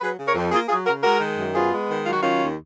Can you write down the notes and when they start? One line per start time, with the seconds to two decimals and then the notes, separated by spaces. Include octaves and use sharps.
0.01 F#3 G#4 B4
0.18 C#3
0.26 A#4 C#5
0.35 F2
0.52 A#3 F4 G#4
0.69 F#3 F4 G#4
0.86 C#3 F#4 A#4
1.03 G#3 F#4 A#4
1.20 D#3
1.37 F#2
1.54 B3 F4 G#4
1.72 G#3
1.89 D#3
2.05 F#3 F4
2.13 F#4
2.21 D#3 C#4 F4
2.40 D#2